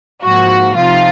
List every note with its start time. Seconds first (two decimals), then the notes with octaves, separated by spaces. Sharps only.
0.23 G#2 F3 A#3 F#4
0.76 C3 F3 C4 D#4 F4